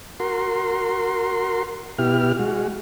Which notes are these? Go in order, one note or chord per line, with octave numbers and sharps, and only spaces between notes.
F#4 A#4 C6
B2 E4 G4 F6
G#3 F#4